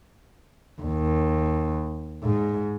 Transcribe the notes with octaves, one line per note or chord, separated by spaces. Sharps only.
D#2
G#2